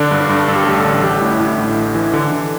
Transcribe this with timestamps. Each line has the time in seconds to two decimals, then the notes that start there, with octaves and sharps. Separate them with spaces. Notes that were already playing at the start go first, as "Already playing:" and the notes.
Already playing: D3 D4
0.11 G2
0.21 D4
0.29 G2
0.48 G2 A4
0.56 G4
0.64 A1 A4
0.84 D3
1.03 A1 G4
1.21 A2
1.31 E4
1.39 A2
1.58 A2
1.76 A1
1.95 E3
2.13 D3
2.32 D3